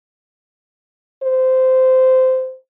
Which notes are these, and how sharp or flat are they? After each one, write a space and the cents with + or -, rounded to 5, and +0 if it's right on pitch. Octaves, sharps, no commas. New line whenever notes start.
C5 -15